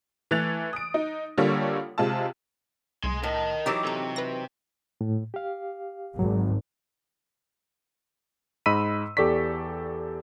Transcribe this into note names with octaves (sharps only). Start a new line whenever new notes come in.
E3 A3 F#6 A6 F7
D#6 D7
D#4
D3 G3 A#3 F4 A4 C#5
C3 G#3 F4 A5
C2 G#4 C6
A2 A#4 D#5
E3 F#3 D#4 G4 D6 E6 A6
C3 A4 A#5
B4 A#6
A2
G4 F5
G#1 F#3
G#2 D#5 B5 E6 B6 D#7
E2 G4 A4 D5 C#6 B6